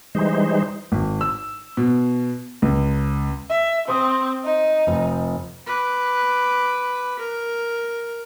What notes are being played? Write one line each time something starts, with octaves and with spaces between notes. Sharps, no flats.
E3 G3 G#3 D#4 C5
G#1
E6
B2
C#2
E5
C4 C5 C6 D#6
D#4
F1
B4 D6
A#4